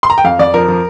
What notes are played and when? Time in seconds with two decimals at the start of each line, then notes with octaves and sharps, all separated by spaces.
0.03 C6
0.10 A#5
0.18 G5
0.24 F2 F5
0.39 F2 D5
0.54 F3 A#4
0.68 F3